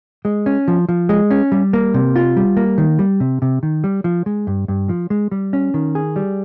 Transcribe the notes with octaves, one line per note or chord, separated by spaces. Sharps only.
G#3
C#4
F3
F3
G#3
C#4
G3
A#3
C3
F4
G3
A#3
D#3
G3
C3
C3
D#3
G3
F3
G#3
G2
G2
F3
G#3
G3
C#4
D#3
G#4
G3